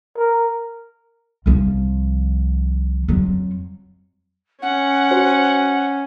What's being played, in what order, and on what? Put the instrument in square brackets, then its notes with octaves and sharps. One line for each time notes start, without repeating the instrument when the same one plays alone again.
[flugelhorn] A#4
[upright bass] C2 F3
F2 F#3
[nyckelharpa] C#4 [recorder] F#5
[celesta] F#4 C5